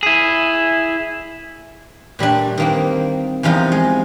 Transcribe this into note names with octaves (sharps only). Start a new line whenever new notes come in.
E4 G#4
A#2 G3 A3 D4
D#3 A#3 C4
E2 C3 F3 D#4 F4 D#5
G#3